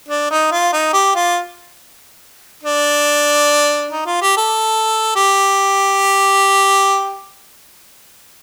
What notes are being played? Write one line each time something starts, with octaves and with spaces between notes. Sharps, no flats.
D4
D#4
F4
D#4
G4
F4
D4
D#4
F4
G4
A4
G4